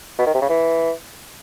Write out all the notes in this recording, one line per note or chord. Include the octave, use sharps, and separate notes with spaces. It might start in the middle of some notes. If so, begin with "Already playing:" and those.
B2
D#3
C3
C#3
E3